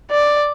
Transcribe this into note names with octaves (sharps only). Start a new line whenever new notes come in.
D5